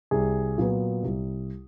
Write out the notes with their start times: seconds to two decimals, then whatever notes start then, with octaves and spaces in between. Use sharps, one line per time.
0.11 C2 G#4
0.58 A#2 F#3 B3
1.03 C2